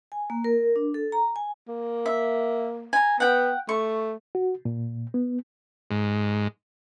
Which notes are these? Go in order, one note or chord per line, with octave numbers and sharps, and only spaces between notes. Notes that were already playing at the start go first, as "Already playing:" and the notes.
G#5
A#3
A#4
D4
A4
A#5
G#5
A#3
E5
G#5 A#5
B3 F#5 G5
A3 C#6
F#4
A#2
B3
G#2